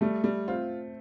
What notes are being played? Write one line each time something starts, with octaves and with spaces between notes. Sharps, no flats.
G3 A3
G3
C4 F4